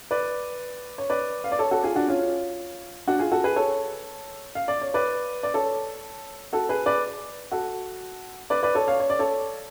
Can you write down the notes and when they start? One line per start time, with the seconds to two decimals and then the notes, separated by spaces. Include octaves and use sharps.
0.11 B4 D5
0.98 C#5
1.10 B4 D5
1.44 F5
1.52 D5
1.59 A4 C#5
1.71 F#4 A4
1.83 F4 G#4
1.96 D4 F#4
2.08 C#4 F4
3.07 D4 F#4
3.19 F4 G#4
3.32 F#4 A4
3.44 G#4 B4
3.56 A4 C#5
4.55 F5
4.68 D5
4.82 C#5
4.94 B4 D5
5.43 D5
5.54 A4 C#5
6.53 F#4 A4
6.69 G#4 B4
6.86 B4 D5
7.52 F#4 A4
8.50 B4 D5
8.63 B4 D5
8.75 A4 C#5
8.88 C#5 F5
9.00 C#5
9.10 D5
9.19 A4 C#5